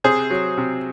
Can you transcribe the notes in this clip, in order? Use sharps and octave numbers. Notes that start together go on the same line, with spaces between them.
C3 G#4 C5
F#3
C3